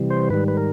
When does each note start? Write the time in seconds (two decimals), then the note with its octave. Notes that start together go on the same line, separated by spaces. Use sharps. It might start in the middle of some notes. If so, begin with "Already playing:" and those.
Already playing: C3 E3 G3
0.10 C5
0.30 G#2 D#3 G3 B4
0.48 B4
0.57 A#4